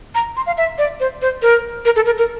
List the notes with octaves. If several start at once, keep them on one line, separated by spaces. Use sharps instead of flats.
A#5
C6
F5
E5
D5
C5
C5
A#4
A#4
A4
A#4
A#4